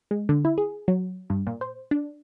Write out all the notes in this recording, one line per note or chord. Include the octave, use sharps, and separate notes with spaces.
G#3
D3
E4
G#4
F#3
G2
A#2
C5
D4